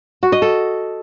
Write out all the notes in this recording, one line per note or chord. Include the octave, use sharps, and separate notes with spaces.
F#4
D#5
A4